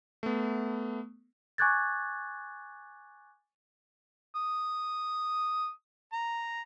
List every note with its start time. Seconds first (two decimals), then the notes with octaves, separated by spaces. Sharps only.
0.23 A3 B3
1.58 G#5 C#6 D6 F#6 G#6 A6
4.35 D#6
6.13 A#5